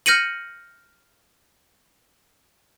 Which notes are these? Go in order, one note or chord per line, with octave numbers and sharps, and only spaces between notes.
F6 G6 A#6 C#7 D#7 F#7